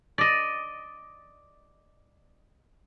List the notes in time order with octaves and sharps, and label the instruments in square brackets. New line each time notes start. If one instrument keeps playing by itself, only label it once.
[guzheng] D5 D#5